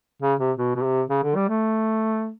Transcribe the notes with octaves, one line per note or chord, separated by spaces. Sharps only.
C#3
C3
B2
B2
C3
C#3
D3
G3
A3